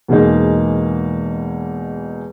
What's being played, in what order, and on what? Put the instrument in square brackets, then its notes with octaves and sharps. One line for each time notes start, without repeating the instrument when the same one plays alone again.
[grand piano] E2 B2 G#3 A#3 D#4